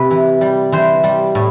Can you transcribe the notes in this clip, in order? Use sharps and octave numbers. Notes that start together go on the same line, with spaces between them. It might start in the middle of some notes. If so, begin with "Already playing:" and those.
Already playing: C3 B4
E3
G3
E3 C5
G3
A2